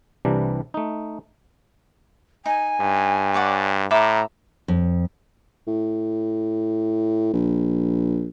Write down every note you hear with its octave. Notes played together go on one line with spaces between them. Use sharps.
C2 C3 E3 G3 D4 A#5
A3 D#4
D#4 G#5
G2
C#5 D5 F#5
A2 E5 A#5 B5 D6
F2
A2
A#1